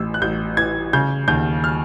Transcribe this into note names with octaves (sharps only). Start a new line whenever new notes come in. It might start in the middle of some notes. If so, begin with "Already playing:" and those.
Already playing: A1 A2 E6
F#6
A1 G6
E3 G#6
C#3 G6
D#2 G6
F6